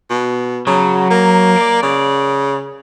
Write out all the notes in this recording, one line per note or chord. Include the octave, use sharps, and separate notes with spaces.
B2
C#3 F#3
A#3
D5
C#3